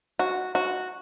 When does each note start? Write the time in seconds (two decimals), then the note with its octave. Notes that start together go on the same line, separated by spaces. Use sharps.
0.19 F#4
0.55 F#4